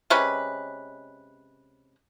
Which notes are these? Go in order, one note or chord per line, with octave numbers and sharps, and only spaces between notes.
C3 G#3 C#4 B4